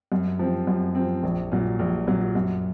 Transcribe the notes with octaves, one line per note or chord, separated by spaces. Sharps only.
F#2
F3 C4
F#2
F3 C4
A#1
A#2 F#3
A#1
A#2 F#3
F#2